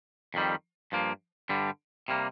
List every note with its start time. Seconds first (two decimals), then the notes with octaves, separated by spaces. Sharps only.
0.34 F2 D#3 G3
0.92 G2 F3 A#3
1.49 G2 D3 G3
2.08 C3 G3 A#3